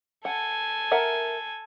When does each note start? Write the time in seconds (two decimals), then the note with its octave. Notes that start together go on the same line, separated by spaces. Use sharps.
0.25 A4 F#5 G#5
0.91 A#4 E5 F#5